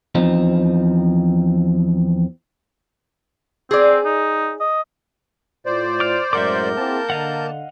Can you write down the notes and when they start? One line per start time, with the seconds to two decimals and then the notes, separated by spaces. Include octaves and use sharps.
0.15 E2 F3 C4 D#4
3.71 C4 G#4 D5
4.05 D#4
4.60 D#5
5.66 A2 F4 C5 D5
6.00 D6 F6
6.33 F#2 A2 G#3 A#4 E5 F#5 D6 G6
6.77 A#3 C4 E4 G#4 A5
7.10 D3 D#5 F5 F#5